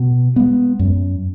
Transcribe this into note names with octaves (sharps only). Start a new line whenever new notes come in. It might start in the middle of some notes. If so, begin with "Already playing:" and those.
Already playing: B2
G#3 B3
F#2